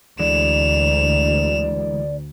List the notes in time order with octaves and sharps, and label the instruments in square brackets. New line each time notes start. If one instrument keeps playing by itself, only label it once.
[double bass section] D2 [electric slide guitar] D3 E3 G#3 [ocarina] D5 [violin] E7 F7